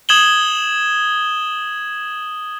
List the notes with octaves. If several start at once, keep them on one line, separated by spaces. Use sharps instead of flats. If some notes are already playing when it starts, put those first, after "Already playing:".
D#6 G#6 E7 F#7 G7